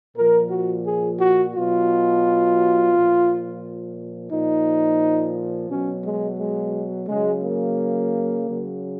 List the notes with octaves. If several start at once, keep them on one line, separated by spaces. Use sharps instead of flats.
A#2 F3 A#4
F#4
G#4
F#4
B2 F#3 F4
A#2 F3
A#2 F3 D#4
B2 F#3 C#4
G#3
G#3
C#3 F#3 G#3
A#3
C#3 F#3